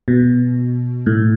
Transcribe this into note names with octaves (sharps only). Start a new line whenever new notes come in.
B2
A2